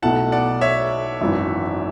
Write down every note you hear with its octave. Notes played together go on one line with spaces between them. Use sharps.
B1 B2 A3 E4 F#5 A5
D5 F#5
C#5 E5
G#1 F#2 E3